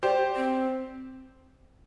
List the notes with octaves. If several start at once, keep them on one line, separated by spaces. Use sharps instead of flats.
G4 C5 D5
C4